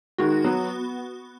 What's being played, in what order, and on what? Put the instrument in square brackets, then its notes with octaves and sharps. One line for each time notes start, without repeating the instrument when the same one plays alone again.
[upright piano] D#3 G#3 [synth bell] F#4
[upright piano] F#3 [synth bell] B3